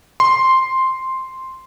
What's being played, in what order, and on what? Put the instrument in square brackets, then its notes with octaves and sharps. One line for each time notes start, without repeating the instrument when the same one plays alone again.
[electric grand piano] C6